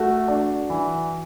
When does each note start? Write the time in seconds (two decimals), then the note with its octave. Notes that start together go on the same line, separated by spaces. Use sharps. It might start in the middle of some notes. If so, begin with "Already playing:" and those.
Already playing: A3 F#4
0.28 D4
0.70 E3